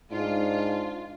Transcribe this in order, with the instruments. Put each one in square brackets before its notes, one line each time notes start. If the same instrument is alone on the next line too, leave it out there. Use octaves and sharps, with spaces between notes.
[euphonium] G#2 [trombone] D4 [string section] F4